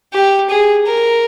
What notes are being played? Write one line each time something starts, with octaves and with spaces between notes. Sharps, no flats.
G4
G#4
A#4